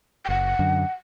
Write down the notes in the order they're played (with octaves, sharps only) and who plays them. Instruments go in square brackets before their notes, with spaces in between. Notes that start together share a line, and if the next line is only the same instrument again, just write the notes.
[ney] G5
[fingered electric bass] F#1 [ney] F#5
[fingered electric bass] F#2 D3